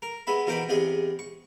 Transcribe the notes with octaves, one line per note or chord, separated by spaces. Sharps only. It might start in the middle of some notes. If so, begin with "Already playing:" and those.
A#4
G#3 B3 E5 B5
B2 E3 A#4 C5 G5 B5
E2 C3 G#4 D#5
C#6